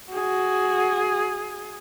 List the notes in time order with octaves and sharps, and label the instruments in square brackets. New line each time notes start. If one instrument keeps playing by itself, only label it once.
[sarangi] F#4 [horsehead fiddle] G#4